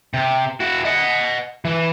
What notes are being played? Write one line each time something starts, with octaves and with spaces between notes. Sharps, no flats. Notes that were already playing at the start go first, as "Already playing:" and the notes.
C3
E4 F#4
D#5 F#5
E3